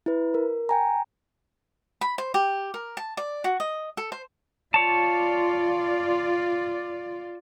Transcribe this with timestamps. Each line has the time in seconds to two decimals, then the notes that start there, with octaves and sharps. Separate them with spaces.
0.06 E4 B4
0.34 A#4
0.69 G5 G#5 A#5
2.01 B5
2.18 C5
2.34 G4
2.74 A#4
2.97 A5
3.17 D5
3.44 F#4
3.60 D#5
3.97 A4
4.12 C5
4.74 F4 C#5 D5 A5